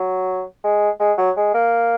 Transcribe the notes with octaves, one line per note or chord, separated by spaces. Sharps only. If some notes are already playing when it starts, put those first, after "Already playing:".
Already playing: F#3
G#3
G#3
F#3
G#3
A#3